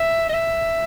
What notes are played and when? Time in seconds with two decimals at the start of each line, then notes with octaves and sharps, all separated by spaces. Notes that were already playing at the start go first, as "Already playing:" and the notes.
Already playing: E5
0.29 D#5
0.33 E5